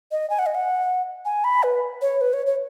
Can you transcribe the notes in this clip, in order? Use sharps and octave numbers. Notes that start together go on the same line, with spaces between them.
D#5
G#5
F#5
D#5
F#5
G#5
B5
B4
C#5
B4
C#5
C#5